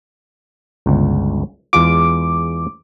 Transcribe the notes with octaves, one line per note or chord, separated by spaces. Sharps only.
G1 C#2
E2 G#3 F4 D6